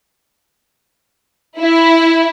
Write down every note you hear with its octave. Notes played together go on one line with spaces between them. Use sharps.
E4